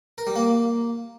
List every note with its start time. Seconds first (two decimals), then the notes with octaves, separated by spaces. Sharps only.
0.18 A#4
0.27 G3
0.36 A#3